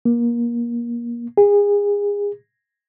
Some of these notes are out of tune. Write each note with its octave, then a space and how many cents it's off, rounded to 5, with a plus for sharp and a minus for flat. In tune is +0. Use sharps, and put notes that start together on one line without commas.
A#3 +25
G#4 -30